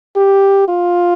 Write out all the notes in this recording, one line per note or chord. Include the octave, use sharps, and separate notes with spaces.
G4
F4